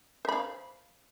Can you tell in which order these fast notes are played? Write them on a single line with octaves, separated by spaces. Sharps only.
C5 B5 F5